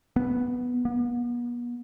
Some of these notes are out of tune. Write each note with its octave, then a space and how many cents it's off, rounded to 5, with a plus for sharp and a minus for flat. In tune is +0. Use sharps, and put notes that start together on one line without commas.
B3 -5
B3 -40